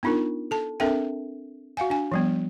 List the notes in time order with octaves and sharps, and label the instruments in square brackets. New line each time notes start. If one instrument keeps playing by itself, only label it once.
[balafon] B3 D4 D#4 F4 A#4
A4 A5
C4 D4 A4 A#4 E5 G5
F#4 F5 F#5 G#5
D4 G#5
F3 G3 B3